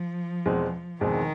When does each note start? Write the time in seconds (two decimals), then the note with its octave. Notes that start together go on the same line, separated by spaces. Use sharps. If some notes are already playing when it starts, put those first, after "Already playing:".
Already playing: F3
0.46 E2 B2 G#3 C4
1.01 E2 B2 D#3 G#3 C4